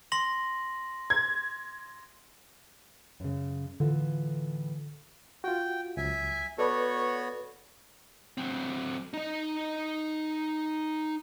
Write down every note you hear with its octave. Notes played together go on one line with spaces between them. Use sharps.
C6 A#6 F#7
G#6
F#2 C#3
A2 D3 E3 F4
F4 F#4 G5
C#2 F#3 E5 G#5
B3 F#4 A4 B4 C#5 D5
F#3 C4
D#4 D#5